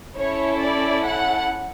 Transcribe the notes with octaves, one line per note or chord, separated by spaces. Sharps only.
C#4 E4 A4 C#5
D5
F#5